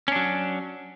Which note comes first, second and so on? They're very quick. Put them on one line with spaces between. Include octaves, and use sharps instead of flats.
C#4 D4 F#3